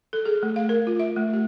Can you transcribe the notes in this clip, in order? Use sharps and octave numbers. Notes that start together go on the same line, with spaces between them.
A4
G#4
A3
F5
A#4
F4
E5
A3
G4